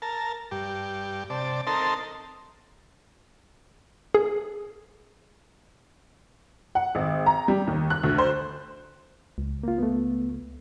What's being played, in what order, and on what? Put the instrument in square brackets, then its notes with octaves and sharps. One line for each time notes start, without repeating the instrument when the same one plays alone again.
[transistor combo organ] A#4 A5
G2 G4
C3 D5 A5
C4 D#4 A4 A#4 A5 C6
[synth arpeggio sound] G#4
[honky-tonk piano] F#5
G#1
A#5
G3
D#2
F#6
D2
C5
[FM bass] C#2
[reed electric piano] A#3 F4
A3 B3